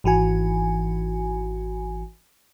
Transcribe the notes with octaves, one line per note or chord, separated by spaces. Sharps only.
G#1 E3 F#4 G#5